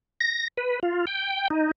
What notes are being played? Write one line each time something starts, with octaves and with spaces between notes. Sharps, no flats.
A#6
B4
F4
G5
D#4